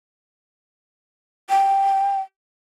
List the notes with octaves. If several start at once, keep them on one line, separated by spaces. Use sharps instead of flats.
G5